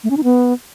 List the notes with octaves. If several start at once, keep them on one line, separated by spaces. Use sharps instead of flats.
A3
C#4
D#4
B3